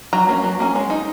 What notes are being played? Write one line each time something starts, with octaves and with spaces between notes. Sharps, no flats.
F#3 A#5
A#3 C#4
F#3
A#3 C#4
G#3
D#4